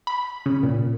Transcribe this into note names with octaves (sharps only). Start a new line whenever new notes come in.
B5
C#3
A#2